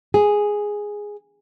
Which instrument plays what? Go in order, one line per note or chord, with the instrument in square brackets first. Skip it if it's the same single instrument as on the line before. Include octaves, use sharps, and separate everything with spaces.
[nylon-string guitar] G#4